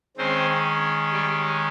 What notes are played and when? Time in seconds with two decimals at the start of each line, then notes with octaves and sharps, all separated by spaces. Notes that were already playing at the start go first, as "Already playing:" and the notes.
0.17 D#3 G#3 C4 C#4 C5
1.12 G3 G4